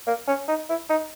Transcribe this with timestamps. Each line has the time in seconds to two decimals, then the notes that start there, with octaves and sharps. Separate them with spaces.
0.07 A#3
0.28 C#4
0.48 D#4
0.69 E4
0.90 D#4